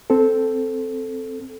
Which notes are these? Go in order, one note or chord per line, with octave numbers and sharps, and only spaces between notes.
C4 A4